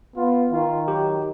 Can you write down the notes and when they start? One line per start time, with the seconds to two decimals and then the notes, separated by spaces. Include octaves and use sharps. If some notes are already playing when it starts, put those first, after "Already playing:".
0.16 B3 F4
0.51 D#3 F4
0.88 F#3 G4